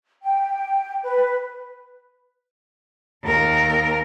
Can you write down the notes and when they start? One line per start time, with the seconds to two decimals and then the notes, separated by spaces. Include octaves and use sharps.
0.23 G5
1.04 B4
3.23 D#2 A#4